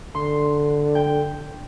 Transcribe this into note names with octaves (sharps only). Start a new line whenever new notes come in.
D3 C6
G5